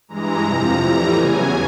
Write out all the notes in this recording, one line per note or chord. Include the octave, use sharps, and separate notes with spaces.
G2 E3 G#3 A#5
F2 C3 F3
A2 E3 G3
E2 C#3 F#3 G#5